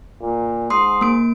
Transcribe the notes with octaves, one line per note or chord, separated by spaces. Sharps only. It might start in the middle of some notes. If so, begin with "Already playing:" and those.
A#2
G#2 C6 D#6 C7
A#3 D7